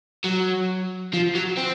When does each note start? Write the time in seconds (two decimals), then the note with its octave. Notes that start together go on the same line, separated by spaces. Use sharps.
0.24 F#3
1.14 F3
1.35 F#3
1.58 C4